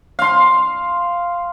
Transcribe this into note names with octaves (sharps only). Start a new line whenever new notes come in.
F5 C6